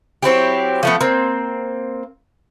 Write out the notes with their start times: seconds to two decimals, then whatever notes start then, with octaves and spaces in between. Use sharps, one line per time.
0.23 F#3 C4 E4 G4
0.83 F3 A3 B3
1.01 A#3 C4